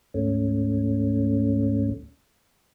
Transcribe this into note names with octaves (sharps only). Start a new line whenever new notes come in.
D2 G#2 A3 C#4